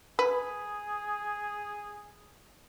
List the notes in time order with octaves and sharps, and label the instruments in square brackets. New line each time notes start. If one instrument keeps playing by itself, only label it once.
[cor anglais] G#4 [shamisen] B4